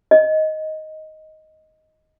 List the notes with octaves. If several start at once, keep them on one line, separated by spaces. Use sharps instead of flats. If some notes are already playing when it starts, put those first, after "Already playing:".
D#5